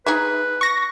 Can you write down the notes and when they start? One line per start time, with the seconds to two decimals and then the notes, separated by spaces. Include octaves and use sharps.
0.06 D#4 G#4 B4 E5
0.61 C#6 A#6